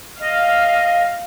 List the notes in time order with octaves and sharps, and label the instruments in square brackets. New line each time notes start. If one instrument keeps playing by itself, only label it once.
[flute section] D#5 [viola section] F5